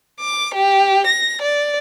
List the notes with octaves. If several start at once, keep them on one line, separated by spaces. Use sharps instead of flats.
D6
G4
A#6
D5